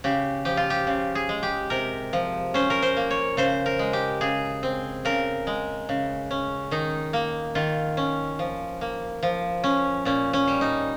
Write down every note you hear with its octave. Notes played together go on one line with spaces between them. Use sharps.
C#3 G4
F3 G4
F4
G4
C#3
G#4
G#3
G4
C3 A#4
F3
C#4 C5
A#4
C5
A#3
C#5
C#3 C5
A#4
G#3
G4
C#3 G#4
C4
C#3 A#4
G#3
C#3
C#4
D#3 D#4
A#3
D#3 F4
C#4
F3
A#3
F3
C#4
A#2 C#4
C#4
G3
D#4